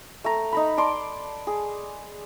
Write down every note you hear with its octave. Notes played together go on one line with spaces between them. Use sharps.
A3 A#5
D#4 A#5 B5
D5 A5 C6 D6
G#4